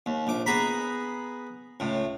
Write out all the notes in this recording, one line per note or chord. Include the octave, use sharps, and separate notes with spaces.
D#2
A#1 D6
B3 G#4 A#5 B5
C#2 A2